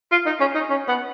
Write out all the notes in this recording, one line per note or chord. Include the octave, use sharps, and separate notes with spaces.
F4
D#4
C#4
D#4
C#4
B3